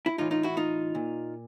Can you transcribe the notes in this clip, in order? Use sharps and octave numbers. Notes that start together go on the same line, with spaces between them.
E4
A2 E3 D#4 F4
D#4 F4
E4 F#4
D#4 F4
A#2